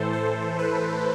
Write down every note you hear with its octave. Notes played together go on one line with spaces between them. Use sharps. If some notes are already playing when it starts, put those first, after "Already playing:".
Already playing: A2 E3 A4 C5
A4 C5
B4